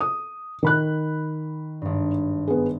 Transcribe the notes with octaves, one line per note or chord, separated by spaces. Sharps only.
D#6
D#3 B5 F#6
G#1 G2
B3 G#4